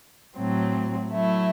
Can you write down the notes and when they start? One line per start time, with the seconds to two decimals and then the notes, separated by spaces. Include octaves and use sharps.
0.37 A2 F#3 C4
1.09 F#3 A3 E4